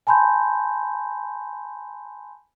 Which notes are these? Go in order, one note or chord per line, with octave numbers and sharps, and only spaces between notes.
G#5 A5 B5 C6 G6